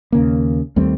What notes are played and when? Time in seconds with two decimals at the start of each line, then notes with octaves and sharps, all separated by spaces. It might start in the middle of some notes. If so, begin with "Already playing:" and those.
0.12 D#2 C#3 A#3
0.76 D#2 G3 A3 C4